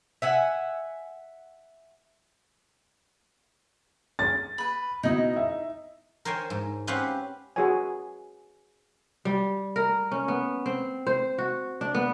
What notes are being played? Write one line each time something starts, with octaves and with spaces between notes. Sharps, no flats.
E5 F#5 G#5
A6
B4 B5
B2 D#4 E4 D#5
E5
A#4 C5 C#5 G5 G#5
G#2
C4 C#4 G4 B4 F5 F#5
F#4 G#4 B4 C#5 G#5
G3
A#4
C#4
B3
C4
C5
F#4
D4
B3